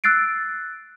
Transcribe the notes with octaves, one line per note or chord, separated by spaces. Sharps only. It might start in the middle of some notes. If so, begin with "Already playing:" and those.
E6 F#6 A6 C7 D7